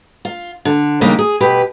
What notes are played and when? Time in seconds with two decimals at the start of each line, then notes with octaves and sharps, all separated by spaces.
0.25 F4
0.65 D3
1.01 D#2 C#3 G3 A#3 D4
1.19 G#4
1.40 B2 G4 B4